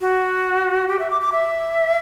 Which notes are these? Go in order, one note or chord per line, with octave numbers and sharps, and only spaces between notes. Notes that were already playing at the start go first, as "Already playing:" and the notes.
F#4
G4
E5
D6
D6
E5